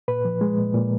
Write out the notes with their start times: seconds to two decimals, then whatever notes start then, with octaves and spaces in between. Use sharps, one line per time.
0.08 A#2 B4
0.25 F3
0.41 G#3
0.58 A#2
0.74 A#2